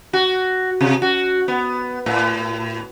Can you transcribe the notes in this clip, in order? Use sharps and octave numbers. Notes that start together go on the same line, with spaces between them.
F#4
C3
F#4
B3
A2